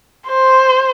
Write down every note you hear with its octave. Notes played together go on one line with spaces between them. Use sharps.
C5